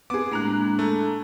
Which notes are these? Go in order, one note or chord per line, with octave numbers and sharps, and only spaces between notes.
B3 C4 G#4 D6
A2 G#3 A#3 D4 A#5 F#6
A3